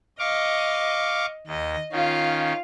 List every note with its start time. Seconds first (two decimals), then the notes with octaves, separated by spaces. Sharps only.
0.19 D#5 F5 C#6 D6
1.47 D#2 D#5
1.92 D#3 C#4 F4 F5